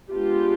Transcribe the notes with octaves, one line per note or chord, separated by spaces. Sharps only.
G#3 B3 D4 F4 G4